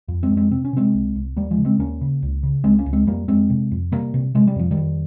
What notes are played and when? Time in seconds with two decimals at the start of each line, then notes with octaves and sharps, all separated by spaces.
0.08 F2
0.23 G#3 C4
0.30 F2
0.37 G#3 C4
0.51 C3 C4
0.65 C#4
0.73 C3 G#3 C4
0.94 C2
1.15 C2
1.36 D#2 G3 A#3
1.51 F3 G#3
1.58 C#3
1.65 G#3 C4
1.79 D#2 A#3 C#4
2.01 C#3
2.23 C#2
2.43 C#3
2.64 C#2 G#3 C4
2.79 A#3 C#4
2.86 C#2
2.93 G#3 C4
3.07 F2 G3 A#3
3.28 F2 G#3 C4
3.50 C3
3.71 F2
3.92 C3 G3 A#3
4.14 C3
4.35 C3 G#3
4.47 G3
4.56 F2 F3
4.71 D#3 G3
4.77 F2